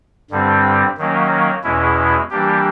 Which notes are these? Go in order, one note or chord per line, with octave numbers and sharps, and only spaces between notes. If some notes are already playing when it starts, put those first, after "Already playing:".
G2 D3 G3 C4
D#3 F#3 A#3 C#4
E2 B2 G#3 C#4 E4
E3 G3 A#3 D4 G4